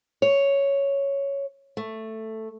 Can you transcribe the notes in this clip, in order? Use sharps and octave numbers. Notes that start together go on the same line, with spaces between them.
C#5
A3